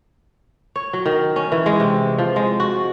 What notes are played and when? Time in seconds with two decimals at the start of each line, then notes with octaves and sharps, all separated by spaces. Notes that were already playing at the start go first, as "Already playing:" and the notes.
0.76 C#5
0.93 F#3
1.06 D#3
1.36 C#4
1.52 E3
1.66 G#3
1.80 C3
2.19 F3
2.36 G#3
2.60 F#4